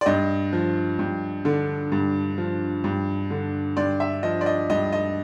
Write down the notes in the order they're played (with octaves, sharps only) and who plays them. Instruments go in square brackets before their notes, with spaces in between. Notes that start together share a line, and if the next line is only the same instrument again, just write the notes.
[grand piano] D5
G2 D#5
F3
G2
D3
G2
F3
G2
D3
G2 D5
E5
F3 D#5
D5
D#5
G2 D#5
D#5